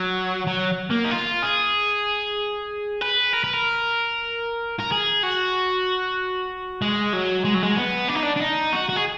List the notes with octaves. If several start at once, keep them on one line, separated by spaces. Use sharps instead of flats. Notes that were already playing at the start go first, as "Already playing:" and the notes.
Already playing: F#3
F#3
A#3
D#4
F4
G#4
B4
A#4
B4
A#4
A#4
G#4
F#4
G#3
F#3
G#3
F#3
G#3
B3
D4
D#4
D4
D4
D#4
F#4
F#4
G#4